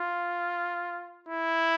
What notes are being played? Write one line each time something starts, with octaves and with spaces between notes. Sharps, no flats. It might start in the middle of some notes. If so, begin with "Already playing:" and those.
Already playing: F4
E4